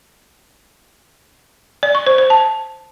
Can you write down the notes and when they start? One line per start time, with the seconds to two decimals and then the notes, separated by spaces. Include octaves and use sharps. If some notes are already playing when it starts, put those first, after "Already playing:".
1.83 D5
1.95 C#6
2.06 C5
2.18 C5
2.30 A5